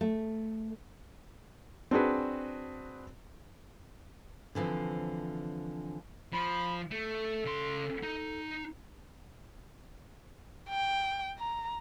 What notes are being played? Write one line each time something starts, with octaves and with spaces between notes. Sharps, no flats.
A3
C4 D4 F#4 G#4 B4
D3 E3 F3 C4
F3 B5
A3 A4
C#3 C6
D#4
G5
A#5